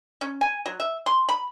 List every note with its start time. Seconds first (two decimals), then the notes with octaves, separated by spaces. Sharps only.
0.21 C#4
0.41 G#5
0.66 F#3
0.80 E5
1.06 C6
1.29 B5